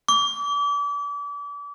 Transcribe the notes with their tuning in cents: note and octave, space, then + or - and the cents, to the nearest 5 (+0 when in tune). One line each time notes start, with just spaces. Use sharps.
D6 -35